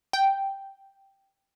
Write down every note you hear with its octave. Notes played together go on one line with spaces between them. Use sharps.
G5